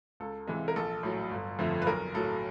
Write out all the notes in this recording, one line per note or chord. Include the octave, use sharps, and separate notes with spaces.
C#2 A4
C3 E3 G#3
A#4
A#1 A4
A2 F#3
G1
F2 D3 F3 A3
B4
B1 A#4
A2 F#3 A4